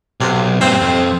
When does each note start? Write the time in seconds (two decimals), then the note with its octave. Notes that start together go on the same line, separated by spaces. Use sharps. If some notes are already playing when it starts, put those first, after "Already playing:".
0.20 B1 C3
0.61 G2 A#2 C4
0.81 F2